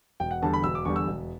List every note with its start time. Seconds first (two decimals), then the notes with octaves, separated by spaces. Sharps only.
0.20 E1 G5
0.31 F#5
0.42 E2 D3 G3 A5
0.54 B5
0.63 E1 E6
0.75 D6
0.85 E2 D3 G3 C#6
0.96 E6
1.07 E1